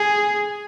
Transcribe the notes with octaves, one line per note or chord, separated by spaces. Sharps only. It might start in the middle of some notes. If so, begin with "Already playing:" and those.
Already playing: G#4